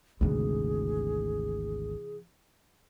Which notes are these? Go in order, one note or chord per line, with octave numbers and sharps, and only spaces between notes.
G#1 D2 C3 E3 G#4